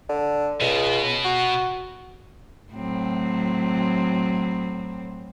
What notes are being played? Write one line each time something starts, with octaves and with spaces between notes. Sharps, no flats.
D3
C#2 B2
F#4
A2 F#3 C4